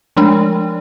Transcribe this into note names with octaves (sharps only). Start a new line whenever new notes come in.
F3 G#3 A3 D4